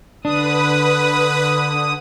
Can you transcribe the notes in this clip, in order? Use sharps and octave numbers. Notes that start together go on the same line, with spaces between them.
D3 D4 B4 D#6